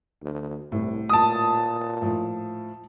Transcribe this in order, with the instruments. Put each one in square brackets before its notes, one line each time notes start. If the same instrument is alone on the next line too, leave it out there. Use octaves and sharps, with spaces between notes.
[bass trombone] D2
[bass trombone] C2 [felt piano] A2
[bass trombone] A#2 [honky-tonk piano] A5 D#6
[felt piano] A2 F3